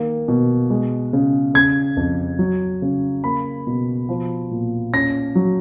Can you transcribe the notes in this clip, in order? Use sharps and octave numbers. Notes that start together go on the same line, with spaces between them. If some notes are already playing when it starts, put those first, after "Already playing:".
Already playing: D#3 A#3
B2
G#3
C#3
C#3 G#6
F2
F#3
C#3
A#3 B5
B2
F3
A#2
C#4 A#6
F#3